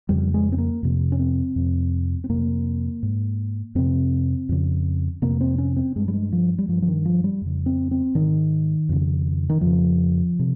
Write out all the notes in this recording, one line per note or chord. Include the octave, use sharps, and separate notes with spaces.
F2 C#3 G3
G#3
C4
A#3
F2 C3
C#4
C4
F2 C3
C4
F2 C3 A#3
G#2
F2 C3 C4
F2 C#3
F2 C3 A#3
C4
C#4
C4
G2 G#3
G3
G#3
F3
G3
G2 F3
F3
D#3
F3
G3
F2 C#3
C4
C4
G#2 D#3
F2 C#3
D#3
F2 C#3 F3
C3